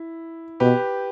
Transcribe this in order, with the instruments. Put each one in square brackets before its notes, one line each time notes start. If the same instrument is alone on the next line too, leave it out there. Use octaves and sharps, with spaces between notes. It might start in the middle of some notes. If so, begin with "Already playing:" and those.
Already playing: [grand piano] E4
[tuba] B2 [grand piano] G4 B4